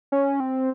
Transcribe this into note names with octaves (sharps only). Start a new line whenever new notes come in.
C#4
C4